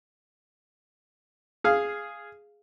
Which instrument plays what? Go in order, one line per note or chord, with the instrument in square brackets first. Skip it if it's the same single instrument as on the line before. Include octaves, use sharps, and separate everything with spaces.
[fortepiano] G#4 F5